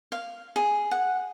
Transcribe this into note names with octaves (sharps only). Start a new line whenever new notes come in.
F5
G#4
F#5